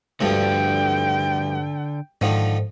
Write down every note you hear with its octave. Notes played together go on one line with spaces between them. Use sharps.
D2 G2 D3 F3 D4 G5
G#2 D3 D#3 F3